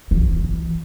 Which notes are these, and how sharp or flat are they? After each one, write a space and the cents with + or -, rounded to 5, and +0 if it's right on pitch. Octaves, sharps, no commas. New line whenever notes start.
E3 +0 F4 +40